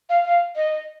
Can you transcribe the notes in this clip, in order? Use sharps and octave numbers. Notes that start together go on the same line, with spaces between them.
F5
F5
D#5